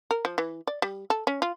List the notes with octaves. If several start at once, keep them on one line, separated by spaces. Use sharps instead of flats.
A#4
F3
E3
D5
G3
A4
C#4
F4